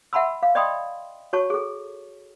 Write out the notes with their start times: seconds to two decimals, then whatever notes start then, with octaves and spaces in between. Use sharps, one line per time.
0.13 E5 F#5 A5 B5 C6 E6
0.43 F5
0.55 D5 D#5 G5 B5 C6 D#6
1.33 F#4 C#5 A5 C#6
1.50 G#4 A4